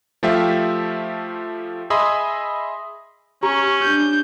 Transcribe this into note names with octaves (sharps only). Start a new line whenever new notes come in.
F3 A3 F4 G4 E5
G#4 D#5 E5 B5 C6 D#6
C#4 G4 A#5 C#6
D4 G6